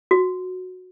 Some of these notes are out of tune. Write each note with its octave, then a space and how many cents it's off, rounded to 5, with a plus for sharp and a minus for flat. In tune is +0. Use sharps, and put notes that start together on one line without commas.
F#4 -10